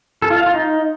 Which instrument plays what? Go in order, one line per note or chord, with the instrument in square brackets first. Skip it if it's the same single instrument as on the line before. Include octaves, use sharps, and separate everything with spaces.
[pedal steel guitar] A4
F4
F5
F4
D#4